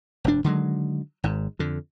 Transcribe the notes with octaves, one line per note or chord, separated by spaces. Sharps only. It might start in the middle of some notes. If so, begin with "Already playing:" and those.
F1 G2 D4
D3 D#3 F#3 G#3
G#1 G#2
F2 D3